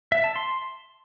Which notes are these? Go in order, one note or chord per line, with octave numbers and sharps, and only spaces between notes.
E5
A5
C6